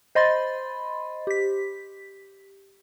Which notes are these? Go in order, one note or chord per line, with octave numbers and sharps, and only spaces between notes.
C5 D#5 B5 C6 A6
G4 B6